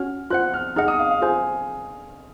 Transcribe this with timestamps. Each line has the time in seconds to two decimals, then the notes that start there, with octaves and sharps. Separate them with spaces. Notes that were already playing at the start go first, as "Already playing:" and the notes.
Already playing: C#4 F#4 C#5 F#5 F6
0.30 F4 C5 F#5 F#6
0.54 F6
0.76 D#4 G#4 D#5 F#5 F6
0.88 D#6
0.99 F5
1.11 F5
1.22 F4 G#4 C5 G#5